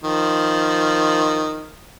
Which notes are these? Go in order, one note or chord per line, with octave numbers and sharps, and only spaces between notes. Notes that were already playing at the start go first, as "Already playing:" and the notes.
D#3 F3